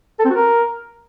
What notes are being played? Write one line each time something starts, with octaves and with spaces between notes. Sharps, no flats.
A4
C4
F#4
A#4